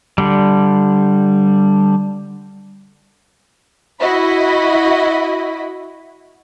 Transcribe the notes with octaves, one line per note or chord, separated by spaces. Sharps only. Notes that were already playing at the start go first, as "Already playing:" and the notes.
D3 G3
E4 F#4 D#5 B5